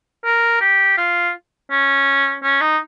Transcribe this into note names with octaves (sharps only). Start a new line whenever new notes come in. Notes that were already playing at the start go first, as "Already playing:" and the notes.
A#4
G4
F4
C#4
C#4
D#4